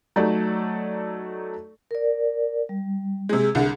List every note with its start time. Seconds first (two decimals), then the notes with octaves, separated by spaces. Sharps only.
0.16 F#3 A3 D#4 A4 D5
1.91 A#4 D5
2.69 G3
3.29 C3 G#3 G#4
3.55 C2 D3